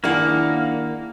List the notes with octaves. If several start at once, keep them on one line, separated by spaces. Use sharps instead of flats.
D#3 A#3 D4 E4 G#4 F#5